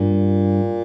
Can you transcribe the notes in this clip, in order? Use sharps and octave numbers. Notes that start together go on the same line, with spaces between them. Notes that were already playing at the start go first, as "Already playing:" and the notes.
Already playing: G2 A#2